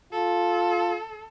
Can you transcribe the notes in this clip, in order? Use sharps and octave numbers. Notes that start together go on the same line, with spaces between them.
F4 A4